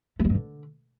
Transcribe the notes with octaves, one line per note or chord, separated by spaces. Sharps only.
A3
G#3
G2
D3